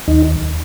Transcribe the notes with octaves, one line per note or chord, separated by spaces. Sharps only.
D#2 D#4